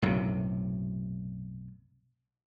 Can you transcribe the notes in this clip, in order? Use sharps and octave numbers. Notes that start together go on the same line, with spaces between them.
B1 F#2 A2 C3